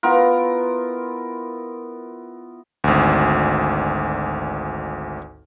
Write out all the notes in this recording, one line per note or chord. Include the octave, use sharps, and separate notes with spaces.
B3 E4 F4 A#4
G#1 D2